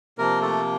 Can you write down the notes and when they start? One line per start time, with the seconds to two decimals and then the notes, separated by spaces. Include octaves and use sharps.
0.18 C3 F3 A#3 A#4
0.42 A3 A4